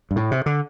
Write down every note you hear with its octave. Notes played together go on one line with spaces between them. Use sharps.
G2
A2
C3
D3